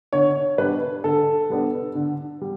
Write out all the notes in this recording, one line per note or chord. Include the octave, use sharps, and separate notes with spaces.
D3 C#5
G3 B3 D4 B4
D3 A4
G3 B3 D4
D3
G3